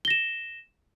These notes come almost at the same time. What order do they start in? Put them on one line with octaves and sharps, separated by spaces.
G7 A#6 E7